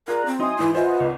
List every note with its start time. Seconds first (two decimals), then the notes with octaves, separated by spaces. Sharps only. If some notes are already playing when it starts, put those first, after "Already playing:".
0.08 F4 G#4 A#4 D5 A#5 F#6
0.26 C4
0.39 F#3 D#4 E4 G#5 C6 D#6
0.59 G#2 E3 E4
0.75 F4 B4 C5 D#5 E5 F#5 G#5
1.00 G#1 C#2